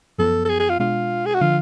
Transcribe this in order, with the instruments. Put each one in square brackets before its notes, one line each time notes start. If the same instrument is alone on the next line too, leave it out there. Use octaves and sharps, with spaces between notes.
[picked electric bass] F#2 F3 B3 [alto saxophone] A4
[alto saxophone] A4
G#4
G#4
F4
[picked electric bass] B2 G#3 D4 [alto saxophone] F4
[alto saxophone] G#4
F#4
[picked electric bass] D3 F3 [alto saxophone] F4